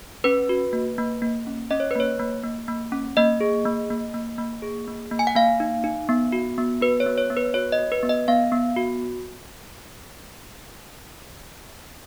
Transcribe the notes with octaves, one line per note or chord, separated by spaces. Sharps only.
C#4 B4
F#4
A#3
A#3
A#3
C#4
C#4 D#5
C#5
B4
A#3 C#5
A#3
A#3
A#3
C#4
A#3 D#5
G#4
A#3
A#3
A#3
A#3
G#4
A#3
A#3
G#5
F#5
A#3 F5
D#4
D#4
B3
F#4
B3
F#4 B4
C#5
B3
C#5
B3
B4
F#4 C#5
D#5
F#4
B4
B3
D#5
B3 F5
B3
F#4